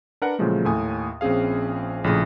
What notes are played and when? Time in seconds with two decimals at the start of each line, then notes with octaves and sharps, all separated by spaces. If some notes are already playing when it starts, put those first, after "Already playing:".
0.22 D4 A#4 B4 F#5
0.39 A#2 C#3 F3 F#3 G#3 A3
0.65 D#2 A2 G#5 D#6
1.21 A#1 C4 C#4 G#4 F5
2.04 A#1 A2 C#3 D#6